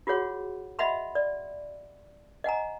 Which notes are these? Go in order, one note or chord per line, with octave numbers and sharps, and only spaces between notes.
F4 F#4 G#4 C#5 F#5
D#5 E5 F#5 B5 C6
D5
D#5 F#5 G#5 A#5